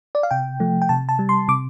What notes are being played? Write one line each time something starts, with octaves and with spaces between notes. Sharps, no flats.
D5
F5
C3 G5
F3 A3
G5
C3 A5
A5
G3
C6
C3 D6